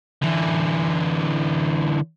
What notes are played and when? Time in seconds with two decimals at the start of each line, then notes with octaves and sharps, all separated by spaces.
0.22 D3 E3